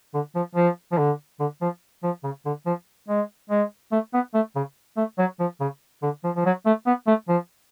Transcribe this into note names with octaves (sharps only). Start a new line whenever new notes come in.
D3
F3
F3
F3
D3
D3
F3
F3
C#3
D3
F3
G#3
G#3
A3
B3
A3
C#3
A3
F#3
F3
C#3
D3
F3
F3
F#3
A3
B3
A3
F3